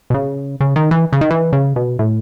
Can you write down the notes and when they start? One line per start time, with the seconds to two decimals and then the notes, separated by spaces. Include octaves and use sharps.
0.10 B2
0.14 C#3
0.61 C#3
0.76 D#3
0.91 E3
1.13 C#3
1.21 D#3
1.30 E3
1.53 C#3
1.76 B2
1.99 A2